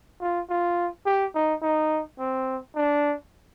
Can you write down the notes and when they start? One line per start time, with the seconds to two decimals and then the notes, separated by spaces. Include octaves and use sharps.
0.21 F4
0.49 F4
1.06 G4
1.35 D#4
1.62 D#4
2.19 C4
2.75 D4